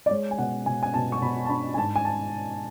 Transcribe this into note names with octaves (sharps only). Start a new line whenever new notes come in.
D5
G#3 C#5
G#5
B2 F#5
B2 G#5
G#5
B2 A5
C#6
B2 B5
A5
D4 B5
G#5
G#2 A5
G#5
A5